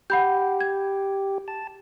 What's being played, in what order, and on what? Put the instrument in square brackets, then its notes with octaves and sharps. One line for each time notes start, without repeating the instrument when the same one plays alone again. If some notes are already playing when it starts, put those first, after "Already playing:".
[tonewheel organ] G4 [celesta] F#5 B5 G6
[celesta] G#6
[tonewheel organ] A5